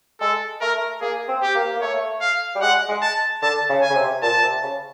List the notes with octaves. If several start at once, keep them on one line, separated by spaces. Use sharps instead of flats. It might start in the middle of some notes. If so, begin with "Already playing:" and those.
G#3 A4
A3 A#4
A#3 G#4
C4
G4
A#3
A#3
A3 C#5
F5
G3
G#3 F#5
G#3
A5
D3 A5
C#3
G#5
C#3
C3
A#2 A5
C3
C#3